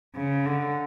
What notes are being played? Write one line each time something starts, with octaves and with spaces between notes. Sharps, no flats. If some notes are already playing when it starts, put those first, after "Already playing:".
C#3
D3